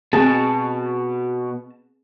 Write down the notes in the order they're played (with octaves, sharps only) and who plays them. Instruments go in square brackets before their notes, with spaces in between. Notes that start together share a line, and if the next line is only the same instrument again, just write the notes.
[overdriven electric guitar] B2 [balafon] C4 [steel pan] G#4 [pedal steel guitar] A5